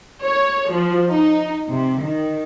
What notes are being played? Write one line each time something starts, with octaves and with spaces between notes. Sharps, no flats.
C#5
F3
D#4
C3
D#3